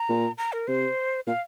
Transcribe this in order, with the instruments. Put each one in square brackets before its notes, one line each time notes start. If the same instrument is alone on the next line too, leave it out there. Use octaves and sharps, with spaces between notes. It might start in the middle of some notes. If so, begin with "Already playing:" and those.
Already playing: [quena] A#5
[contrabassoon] A#2
[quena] A#5
A#4
[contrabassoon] C3 [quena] C5
[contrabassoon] A#2 [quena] F5